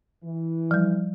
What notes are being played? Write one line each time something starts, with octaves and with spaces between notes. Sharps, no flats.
E3
F3 G3